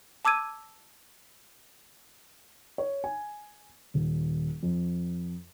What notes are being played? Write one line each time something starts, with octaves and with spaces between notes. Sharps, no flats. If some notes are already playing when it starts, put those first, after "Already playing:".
A5 D6 E6 G#6 D#7
C#5
G#5
D#1
F2